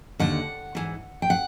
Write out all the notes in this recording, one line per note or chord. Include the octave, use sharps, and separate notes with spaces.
D#2 D3 F#5
G#2 E3
G5
F#5